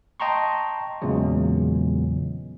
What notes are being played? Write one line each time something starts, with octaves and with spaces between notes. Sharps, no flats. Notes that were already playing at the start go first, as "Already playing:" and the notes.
D#5 G5 A5 A#5 C6 C#6
E2 A#2 C#3 F#3 G#3